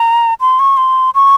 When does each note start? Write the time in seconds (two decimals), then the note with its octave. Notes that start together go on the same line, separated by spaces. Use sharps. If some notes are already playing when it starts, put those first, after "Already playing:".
Already playing: A#5
0.41 C6
0.59 C#6
0.77 C6
1.15 C#6